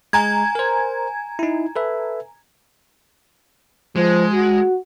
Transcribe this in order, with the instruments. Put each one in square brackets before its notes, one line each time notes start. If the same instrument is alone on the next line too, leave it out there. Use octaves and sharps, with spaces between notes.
[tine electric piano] G#3 [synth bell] G#5 A#5 G#6
[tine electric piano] A#4 C5
D#4 E4
A4 B4 E5
[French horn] F3 [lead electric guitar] G#3
[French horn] F#4